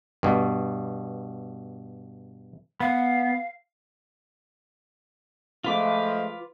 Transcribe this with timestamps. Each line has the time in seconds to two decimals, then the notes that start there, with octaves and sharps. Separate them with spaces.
0.23 G2 B2
2.80 B3 F5
5.64 F3 G#3 A3 F4 B4 D6